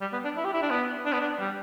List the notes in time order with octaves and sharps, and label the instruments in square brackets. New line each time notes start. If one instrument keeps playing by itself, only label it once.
[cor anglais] G3
B3
D4
E4
G4
E4
D4
B3
D4
B3
D4
G3